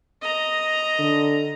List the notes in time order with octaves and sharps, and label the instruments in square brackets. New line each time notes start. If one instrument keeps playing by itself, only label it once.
[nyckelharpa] D#5 A#5
[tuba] D3